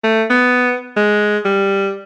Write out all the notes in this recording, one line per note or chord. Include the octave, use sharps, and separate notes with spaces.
A3
B3
G#3
G3